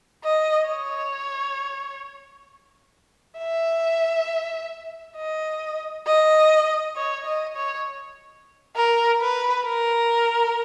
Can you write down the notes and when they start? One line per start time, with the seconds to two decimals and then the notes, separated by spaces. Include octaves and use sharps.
0.24 D#5
0.69 C#5
3.38 E5
5.17 D#5
6.07 D#5
6.96 C#5
7.26 D#5
7.56 C#5
8.76 A#4
9.21 B4
9.65 A#4